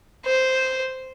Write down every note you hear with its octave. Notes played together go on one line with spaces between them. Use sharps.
C5